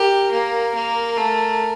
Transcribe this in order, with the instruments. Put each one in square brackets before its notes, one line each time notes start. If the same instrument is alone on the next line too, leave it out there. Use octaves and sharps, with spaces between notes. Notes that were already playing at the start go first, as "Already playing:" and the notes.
Already playing: [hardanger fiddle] G4 [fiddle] A#4
[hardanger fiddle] A#3
A#3
A3